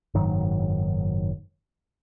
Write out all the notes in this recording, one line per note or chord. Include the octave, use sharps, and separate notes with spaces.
F#1 G#2 D#3 F#3